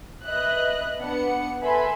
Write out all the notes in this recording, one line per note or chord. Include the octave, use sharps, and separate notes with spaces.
B4 D#5 E5 F#6
B3 D4 F#5 C#7
A4 B4 E5 G#5 B5 C6